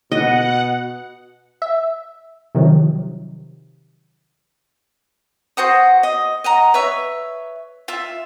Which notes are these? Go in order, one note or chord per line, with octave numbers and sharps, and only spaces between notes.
B2 D#5 F#5
E5
C3 D#3 F3 F#3
F#4 C5 F#5 D#6
D#5
D#5 F#5 A#5
B4 C#5 E5
F4 E5